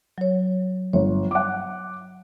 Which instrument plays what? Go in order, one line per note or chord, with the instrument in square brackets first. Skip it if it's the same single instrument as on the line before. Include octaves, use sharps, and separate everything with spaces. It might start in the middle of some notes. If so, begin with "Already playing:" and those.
[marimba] F#3 C#5
[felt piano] G1 [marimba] C#5
[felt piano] F#5 D6